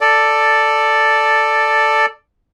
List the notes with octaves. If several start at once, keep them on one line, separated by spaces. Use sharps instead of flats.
A4 D5